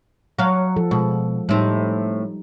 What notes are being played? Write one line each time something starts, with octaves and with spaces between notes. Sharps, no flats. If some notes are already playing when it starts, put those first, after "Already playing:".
F#3 F5 F#5
F3 A4
B2 G#3
A2 G3 C4 D#4